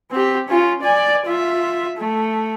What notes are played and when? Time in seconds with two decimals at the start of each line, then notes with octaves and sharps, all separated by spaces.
0.11 C4 G4
0.48 C#4 F4
0.81 D5 G#5
1.26 F4 E5
1.98 A3